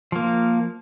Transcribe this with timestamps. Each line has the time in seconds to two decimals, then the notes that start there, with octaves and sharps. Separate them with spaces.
0.12 F3 A#3